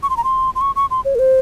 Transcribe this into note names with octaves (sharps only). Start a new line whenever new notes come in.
C#6
C6
A#5
C6
C6
C#6
C#6
C6
C#5
A#4
C5